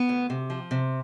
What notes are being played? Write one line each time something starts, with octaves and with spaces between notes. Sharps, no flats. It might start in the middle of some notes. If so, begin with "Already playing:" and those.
Already playing: B3
D2
C3
F3
C3